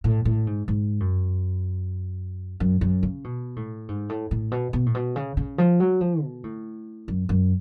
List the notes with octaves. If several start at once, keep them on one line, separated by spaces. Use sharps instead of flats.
A2
A2
G#2
G#2
F#2
F#2
F#2
C#3
B2
A2
G#2
A2
A2
B2
B2
A2
B2
C#3
C#3
F3
F#3
F3
B2
A2
F#2
F#2